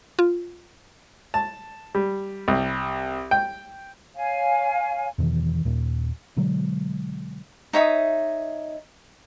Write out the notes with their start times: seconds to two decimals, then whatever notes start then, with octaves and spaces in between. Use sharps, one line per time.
0.19 F4
1.34 A5
1.95 G3
2.48 C2
3.31 G5
4.15 C#5 F5 G#5
5.18 E2 B2 D#3 E3
5.65 D#2 A#2
6.37 B2 D3 F#3 G#3
7.73 D#4 C#5 E5 D#6